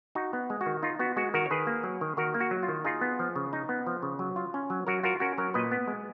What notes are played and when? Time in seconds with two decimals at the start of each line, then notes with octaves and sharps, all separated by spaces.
0.15 D#4 F#4
0.33 B3
0.50 G#3
0.61 F#4
0.66 D#3
0.83 D#4 F4
0.99 B3 F#4
1.16 G#3 F#4
1.34 D#3 F#4 A#4
1.46 C#5
1.51 D#3 G#4 B4
1.67 A#3
1.83 F#3
2.01 D#3
2.17 D#3 F#4 A#4
2.34 A#3
2.40 F#4
2.51 F#3
2.63 F4
2.68 D#3
2.85 D#4 F4 G#4
3.01 B3
3.19 F3
3.36 C#3
3.53 D#4
3.69 B3
3.87 F3
4.03 C#3
4.19 F#3
4.36 F4
4.54 C#4
4.70 F#3
4.87 F#3 F#4 A#4
5.03 F4 F#4 A#4
5.20 C#4 F#4 A#4
5.38 F#3 A#4 C#5
5.54 A#2 B4 D#5
5.71 B3
5.88 G#3